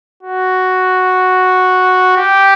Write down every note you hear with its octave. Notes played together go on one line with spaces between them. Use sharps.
F#4
G4